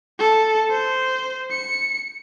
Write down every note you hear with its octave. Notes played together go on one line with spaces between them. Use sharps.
A4
C5
C#7